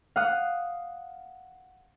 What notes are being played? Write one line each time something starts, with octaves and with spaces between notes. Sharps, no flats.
F5 F#5 D#6 F#6